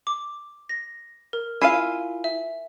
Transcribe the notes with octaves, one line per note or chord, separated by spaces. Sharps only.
D6
A#6
A#4
E4 F4 F5 G#5 C7 D#7
E5